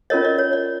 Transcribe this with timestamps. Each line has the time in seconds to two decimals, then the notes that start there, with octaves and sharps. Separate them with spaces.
0.10 C#4 F4 A#4 C#5 D#5
0.24 D5
0.38 C#5
0.53 D5